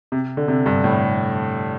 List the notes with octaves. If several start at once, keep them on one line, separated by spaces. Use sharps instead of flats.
C3
D3
C3
G2
A2